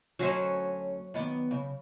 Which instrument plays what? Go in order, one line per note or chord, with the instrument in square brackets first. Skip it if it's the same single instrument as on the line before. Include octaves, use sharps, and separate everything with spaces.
[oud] D2 C#4 D#5 [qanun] F#3 F#4 C5
[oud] D#3 B3 D5
C#3